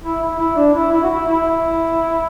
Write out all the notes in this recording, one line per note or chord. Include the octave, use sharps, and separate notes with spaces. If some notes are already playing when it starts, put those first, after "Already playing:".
E4
E4
E4
D4
E4
E4
F#4
E4
E4